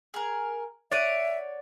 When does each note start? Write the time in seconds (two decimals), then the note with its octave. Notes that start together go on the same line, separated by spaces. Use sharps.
0.14 G#4 A#4
0.92 C#5 D5 E5 F#5 D7 D#7